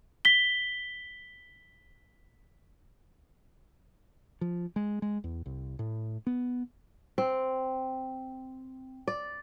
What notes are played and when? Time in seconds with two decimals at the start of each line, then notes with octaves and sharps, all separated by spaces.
0.25 B6 G7
4.41 F3
4.76 G#3
5.02 G#3
5.24 E2
5.46 C2
5.79 A2
6.27 B3
7.18 C4
9.08 D5